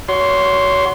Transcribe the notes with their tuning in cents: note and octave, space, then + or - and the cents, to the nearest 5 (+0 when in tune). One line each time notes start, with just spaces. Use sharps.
F#4 +10 C#5 +30 C6 +0